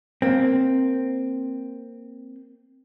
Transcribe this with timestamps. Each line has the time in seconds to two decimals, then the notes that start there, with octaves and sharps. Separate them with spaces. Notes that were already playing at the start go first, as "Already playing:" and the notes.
0.22 A#3 C4